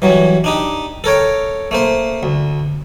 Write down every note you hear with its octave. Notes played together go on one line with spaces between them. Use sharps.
E3 F#3 G3
D4 D#4 G4
A4 A#4 C#5 G5
A3 A#3 C5
D2